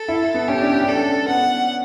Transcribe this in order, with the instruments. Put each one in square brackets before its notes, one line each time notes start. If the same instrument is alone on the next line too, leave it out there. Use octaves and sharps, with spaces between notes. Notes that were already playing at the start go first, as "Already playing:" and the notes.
Already playing: [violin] A4
[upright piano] E4
B3
[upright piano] C#4 [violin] G4
[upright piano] D4
C#4
[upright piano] D4 [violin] A4
[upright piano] C#4
[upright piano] B3 [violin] F#5